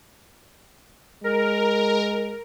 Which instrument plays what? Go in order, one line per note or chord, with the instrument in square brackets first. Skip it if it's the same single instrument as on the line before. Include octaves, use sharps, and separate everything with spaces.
[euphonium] G#3 [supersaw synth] A#4